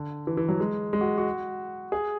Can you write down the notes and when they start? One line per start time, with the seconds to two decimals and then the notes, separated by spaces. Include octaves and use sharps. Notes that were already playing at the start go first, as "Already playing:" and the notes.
Already playing: D3
0.27 E3
0.37 E3
0.48 F#3
0.60 G#3
0.93 G#3
1.01 F#4
1.18 F#4
1.92 G#4